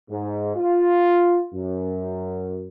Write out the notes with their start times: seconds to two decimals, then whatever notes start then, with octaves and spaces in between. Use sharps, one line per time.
0.10 G#2
0.55 F4
1.54 F#2